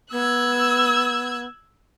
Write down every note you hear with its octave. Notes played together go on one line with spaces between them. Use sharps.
B3 E6 F#6 G#6